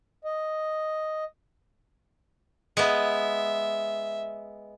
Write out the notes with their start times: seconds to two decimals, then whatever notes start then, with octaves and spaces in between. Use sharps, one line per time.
0.25 D#5
2.77 G#3 B3 E5